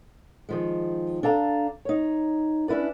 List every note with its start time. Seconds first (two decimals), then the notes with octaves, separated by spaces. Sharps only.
0.49 D#3 F3 G#3
1.23 D4 A4 F5 G#5 A#5
1.85 D#4 C#5
2.68 C#4 D4 E4 B4 D5